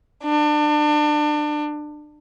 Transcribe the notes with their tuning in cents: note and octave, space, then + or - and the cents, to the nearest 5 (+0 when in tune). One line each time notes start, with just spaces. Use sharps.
D4 +30